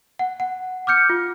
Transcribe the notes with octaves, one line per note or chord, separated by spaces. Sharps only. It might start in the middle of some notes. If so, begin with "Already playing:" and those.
F#5
F#5
D6 F6 G6 C#7
F4